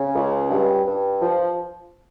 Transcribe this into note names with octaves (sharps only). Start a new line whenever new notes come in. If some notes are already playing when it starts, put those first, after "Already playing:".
Already playing: C#3
C#2
G2
G2
F3